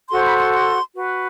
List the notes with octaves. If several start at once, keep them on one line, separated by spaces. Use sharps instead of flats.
F#4 A4 C5 C6
B5
C6
C6
F#4 B4